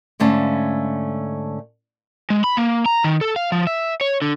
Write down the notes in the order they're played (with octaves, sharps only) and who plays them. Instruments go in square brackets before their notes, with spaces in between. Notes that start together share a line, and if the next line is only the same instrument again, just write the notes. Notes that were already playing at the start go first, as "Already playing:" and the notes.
[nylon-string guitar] G#2 D3 A3 C#4 F5
[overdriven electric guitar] G#3
B5
A#3
A#5
D#3
A4
F5
F3
E5
C#5
D3